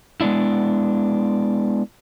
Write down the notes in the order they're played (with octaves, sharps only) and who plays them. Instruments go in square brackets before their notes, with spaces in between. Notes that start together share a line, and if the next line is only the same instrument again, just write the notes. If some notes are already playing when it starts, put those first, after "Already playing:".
[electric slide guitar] G#3 B3 D4 E4